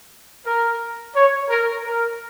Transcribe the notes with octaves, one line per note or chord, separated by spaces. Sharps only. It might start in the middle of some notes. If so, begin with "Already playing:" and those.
A#4
C#5
A#4
A#4